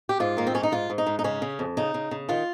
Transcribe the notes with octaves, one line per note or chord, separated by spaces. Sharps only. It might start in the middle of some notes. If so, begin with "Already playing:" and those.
G4
G#2 F4
D#3 A#3
C4
G#2 C#4
D#4
G#2 F4
G#2
D#4
G#2
D#4
C#3 C#4
C#3
F2
C#3 D#4
C#3
C#3
D#3 F4